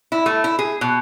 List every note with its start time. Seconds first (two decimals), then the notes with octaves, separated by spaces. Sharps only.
0.12 E4
0.26 A3
0.44 E4
0.59 G#4
0.81 B2